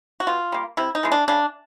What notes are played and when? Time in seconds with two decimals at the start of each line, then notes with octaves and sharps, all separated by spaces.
0.20 F#4
0.27 B2 F4
0.52 G3 A#3
0.77 C3 E4
0.95 D#4
1.03 E3 G#3 B3
1.12 D4
1.28 C#3 D4